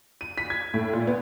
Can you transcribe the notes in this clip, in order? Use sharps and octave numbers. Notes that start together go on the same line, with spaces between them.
D#7
B6
G#6
A2
A#2
B3